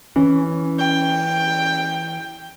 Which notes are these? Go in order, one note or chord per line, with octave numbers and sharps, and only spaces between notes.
E3 C#4
G5